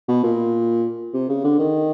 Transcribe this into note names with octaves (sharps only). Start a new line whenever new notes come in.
B2
A#2
C3
C#3
D3
D#3